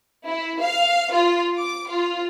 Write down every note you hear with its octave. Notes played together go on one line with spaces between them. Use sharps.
E4
F5
F4
D6
F4